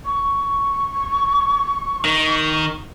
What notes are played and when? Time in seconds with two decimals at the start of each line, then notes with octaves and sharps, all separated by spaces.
0.05 C#6
2.05 D#3